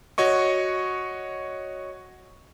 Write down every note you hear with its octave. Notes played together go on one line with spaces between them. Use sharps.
F#4 C#5 D#5 C#6